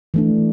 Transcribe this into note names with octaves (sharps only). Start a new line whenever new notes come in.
E3 A3 D4